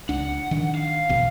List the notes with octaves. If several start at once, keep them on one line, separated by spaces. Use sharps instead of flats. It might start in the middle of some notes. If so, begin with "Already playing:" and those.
C#2 D4 F#5
D#3 D4
F5
A#1 E2 B2